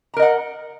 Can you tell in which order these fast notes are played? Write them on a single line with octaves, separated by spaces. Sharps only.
A#5 A#4 D#5 F#5